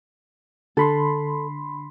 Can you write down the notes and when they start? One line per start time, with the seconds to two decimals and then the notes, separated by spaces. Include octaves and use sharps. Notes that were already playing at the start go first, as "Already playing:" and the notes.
0.77 D3 A4 B5 C6